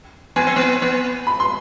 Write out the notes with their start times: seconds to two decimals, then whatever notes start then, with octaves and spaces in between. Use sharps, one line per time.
0.36 B3 G#5
0.47 C4
0.56 B3
0.82 B3
1.27 B5
1.40 C6